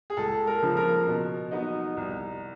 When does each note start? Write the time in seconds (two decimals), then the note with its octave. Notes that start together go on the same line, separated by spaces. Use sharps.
0.10 G#4
0.17 C#2 A4
0.47 A#4
0.62 C#3 F3
0.77 A#4
1.07 B2
1.51 F#3 B3 D#4
1.97 C2